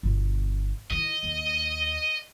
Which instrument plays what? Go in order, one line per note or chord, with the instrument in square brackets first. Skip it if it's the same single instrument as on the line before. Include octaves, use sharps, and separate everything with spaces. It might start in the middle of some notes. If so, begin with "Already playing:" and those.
[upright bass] G1 B2
[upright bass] D#3 E4 [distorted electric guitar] D#5
[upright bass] D#2